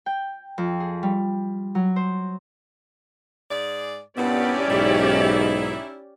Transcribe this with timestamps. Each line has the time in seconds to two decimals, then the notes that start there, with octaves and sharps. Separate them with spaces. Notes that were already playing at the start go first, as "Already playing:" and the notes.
0.06 G5
0.58 F2
0.80 G#4
1.03 G3
1.75 F#3
1.96 C5
3.51 G#2 G#4 D5
4.17 G2 A#2 B3 C#4 E4 G4 D5
4.69 B1 G#2 D#4 E4